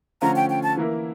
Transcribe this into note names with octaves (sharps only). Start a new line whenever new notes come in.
D3 F3 A3 C#4 F4 A#5
G5
G5
A5
E3 A#3 E4 A#4